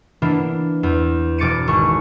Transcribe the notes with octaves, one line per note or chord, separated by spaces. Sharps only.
E3 A#3 B3 D4
E2
E1 D6 A6 C#7 D#7
G#1 C#6